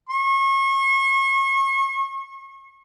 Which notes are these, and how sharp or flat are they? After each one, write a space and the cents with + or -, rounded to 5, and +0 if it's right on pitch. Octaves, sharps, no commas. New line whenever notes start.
C#6 -35